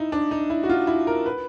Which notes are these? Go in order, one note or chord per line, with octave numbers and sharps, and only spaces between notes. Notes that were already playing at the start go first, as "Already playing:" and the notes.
Already playing: D#4 E4
D4
D#4
E4
F#4
F4
E4
A#4
B4